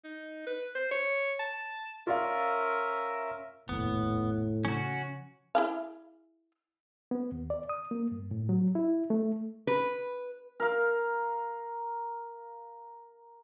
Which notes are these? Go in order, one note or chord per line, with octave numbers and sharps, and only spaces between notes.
D#4
B4
C5
C#5
A5
C#4 F4 A#4 D5 E5 F5
F1 A#1 D#2 A2 B3
C#3 F3 C#4 F#4
E4 G#4 F5
B3
D#2
D5
D#6
A#3
G2
A2
F#3
E4
A3
B4
A#4 F5